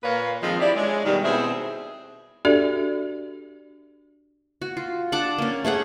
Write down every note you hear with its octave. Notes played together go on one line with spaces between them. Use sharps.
A#2 A#3 B4 C#5 F5
D#3 F3 G#3 C4
E4 G4 D5
G#3 D4 C#5
B2 D#3 F#3 G3
B2 C4 E4 G#4 C5 E5
D4 F#4 G4 A4 D5 E5
F#4
F4
D4 F#5 A5 D6
A#3 C#4
A3 C#4 G#4 F#5